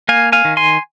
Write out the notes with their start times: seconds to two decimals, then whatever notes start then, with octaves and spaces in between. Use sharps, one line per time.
0.09 A#3 F5 G#5
0.32 F5 G#5
0.45 D#3
0.57 G#5 C6